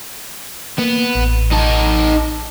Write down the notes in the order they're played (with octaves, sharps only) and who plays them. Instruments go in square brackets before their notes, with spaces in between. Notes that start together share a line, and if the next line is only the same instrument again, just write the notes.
[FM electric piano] A#3 [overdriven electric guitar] B3
[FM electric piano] A1
[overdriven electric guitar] D#4 A4